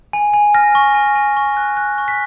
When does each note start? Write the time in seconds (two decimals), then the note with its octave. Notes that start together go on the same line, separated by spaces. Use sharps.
0.13 G#5
0.33 G#5
0.54 F6 A#6
0.75 C#6
0.95 G#5
1.15 G#5
1.37 C#6
1.57 F#6
1.77 F#6
1.98 C#6
2.08 B6